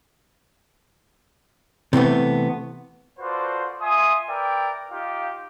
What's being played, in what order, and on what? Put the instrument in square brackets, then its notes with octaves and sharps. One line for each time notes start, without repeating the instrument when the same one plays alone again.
[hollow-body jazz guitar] C3 E3 A3 B3
[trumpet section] F4 F#4 A4 B4 C5 D5
F4 E5 G#5 C6 D#6
A#4 B4 D5 E5 G5
D#4 F4 G4 F5